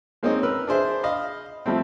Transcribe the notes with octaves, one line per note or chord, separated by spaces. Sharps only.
G#3 A#3 C4 C#4 D#4 D#5
A#4 B4 E6
D4 G#4 C5 E5
D#5 F5 B5
F3 G3 A3 C4